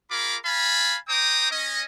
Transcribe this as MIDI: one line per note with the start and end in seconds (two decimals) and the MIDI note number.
0.11 0.37 65
0.11 0.37 68
0.11 0.37 70
0.11 0.37 83
0.11 0.37 86
0.45 0.98 77
0.45 0.98 80
0.45 0.98 81
0.45 0.98 83
1.09 1.51 72
1.09 1.51 79
1.09 1.51 82
1.09 1.51 86
1.09 1.51 87
1.51 1.83 61
1.51 1.83 75